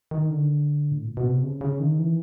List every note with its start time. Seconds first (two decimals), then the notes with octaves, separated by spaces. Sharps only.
0.11 D#3
0.30 D3
0.91 A2
1.05 A#2
1.17 B2
1.29 C3
1.43 C#3
1.61 C#3
1.80 D#3
1.99 E3